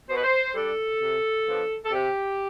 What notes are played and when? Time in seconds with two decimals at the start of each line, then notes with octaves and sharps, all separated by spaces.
0.10 B2 C5
0.17 B4
0.23 C5
0.54 G3 D4 A4
1.00 C3
1.46 F3 B3 D4
1.85 A4
1.91 C3 G4